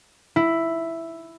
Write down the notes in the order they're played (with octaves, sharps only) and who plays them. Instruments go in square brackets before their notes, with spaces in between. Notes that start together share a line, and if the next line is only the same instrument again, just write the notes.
[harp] E4